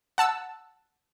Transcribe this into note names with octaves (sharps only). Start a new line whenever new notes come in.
F#5 A5 E6